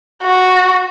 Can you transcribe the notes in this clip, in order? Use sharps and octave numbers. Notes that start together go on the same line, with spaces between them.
F#4